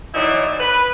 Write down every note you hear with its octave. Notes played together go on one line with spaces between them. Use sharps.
E3 F#3 D#4 E4 C#5 D5
B4